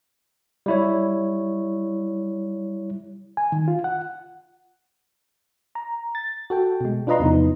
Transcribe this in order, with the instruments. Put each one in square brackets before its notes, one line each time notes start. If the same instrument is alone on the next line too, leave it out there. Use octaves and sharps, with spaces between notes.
[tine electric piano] G3 E4 C#5
[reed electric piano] G#5
D#3
F4
F#5
[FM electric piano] A#5
A6
F#4 A4 G5
B2 G#3
D4 F4 B4 D#5 A#5 C6
E2 C3 E3 F3 B3 D#4